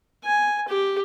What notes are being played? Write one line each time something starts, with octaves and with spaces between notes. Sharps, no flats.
G#5
G4